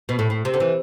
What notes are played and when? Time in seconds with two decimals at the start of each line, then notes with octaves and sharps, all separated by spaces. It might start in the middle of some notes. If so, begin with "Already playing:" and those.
0.09 B2
0.19 A2
0.30 A2
0.45 C3
0.54 D3
0.60 E3